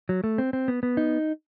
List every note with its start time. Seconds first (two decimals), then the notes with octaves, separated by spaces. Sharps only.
0.09 F#3
0.24 A3
0.38 C4
0.53 C4
0.68 B3
0.83 B3
0.97 D#4